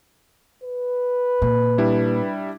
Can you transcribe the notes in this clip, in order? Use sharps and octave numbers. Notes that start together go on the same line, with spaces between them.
B4
A#2
G3 D4 E4